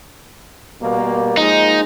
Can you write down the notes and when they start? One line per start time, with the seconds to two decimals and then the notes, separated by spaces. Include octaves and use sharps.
0.81 B2 G3 A#3
1.37 F3 G#3 A#3 D#4